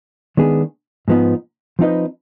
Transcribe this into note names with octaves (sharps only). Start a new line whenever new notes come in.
D#3 G#3 B3 D4 G#4
G#2 F3 B3 D#4
F3 C4 D#4 B4 D#5